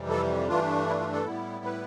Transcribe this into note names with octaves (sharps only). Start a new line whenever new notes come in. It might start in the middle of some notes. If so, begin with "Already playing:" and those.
Already playing: F2 C3 E3 G3
A4
G2 E3 A3 D4 F4
E4
F4
A4
A2 G3 B3 E4
B4